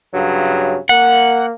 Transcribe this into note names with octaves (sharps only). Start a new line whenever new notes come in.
G2 C#3 F#3
A#3 F#5